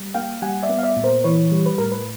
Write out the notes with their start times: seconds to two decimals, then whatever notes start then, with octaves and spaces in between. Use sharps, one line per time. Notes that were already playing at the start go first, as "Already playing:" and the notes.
Already playing: G3
0.14 A#3 F5 G5
0.42 G3 F#5 G#5
0.63 D5 E5
0.69 B3
0.79 F5
0.83 D5 E5
0.97 A#2
1.04 A#4 C5
1.24 E3 B4 C#5
1.52 G3
1.66 B4
1.78 A2 A#4
1.92 B4